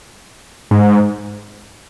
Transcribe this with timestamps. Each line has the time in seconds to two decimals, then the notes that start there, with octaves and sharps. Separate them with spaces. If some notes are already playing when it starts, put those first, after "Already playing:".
0.71 G#2